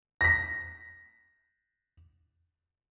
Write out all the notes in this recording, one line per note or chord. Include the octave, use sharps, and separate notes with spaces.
A#6 B6